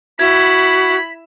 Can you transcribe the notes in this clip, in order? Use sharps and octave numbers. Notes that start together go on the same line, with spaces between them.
E4 F#4 B5 G#6